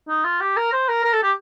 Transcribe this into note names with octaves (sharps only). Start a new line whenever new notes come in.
D#4
F4
G4
A#4
C5
A#4
A#4
A4
G4